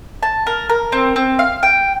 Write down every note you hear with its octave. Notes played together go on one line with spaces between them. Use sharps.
A5
A#4
A#4
C4
C4
F5
G5